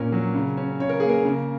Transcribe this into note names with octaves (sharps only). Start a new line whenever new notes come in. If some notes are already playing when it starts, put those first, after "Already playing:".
Already playing: A#2 A#3 C#4 A#4
F#3
C#3
C#4
C#3 C#5
A#4
A#3 G#4
A#4
C#3